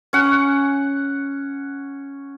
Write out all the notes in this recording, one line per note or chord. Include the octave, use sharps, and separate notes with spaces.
C#4 F#5